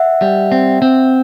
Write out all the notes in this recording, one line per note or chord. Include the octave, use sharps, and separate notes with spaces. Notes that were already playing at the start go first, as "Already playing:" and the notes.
Already playing: E5 F#5
G3
C4
C4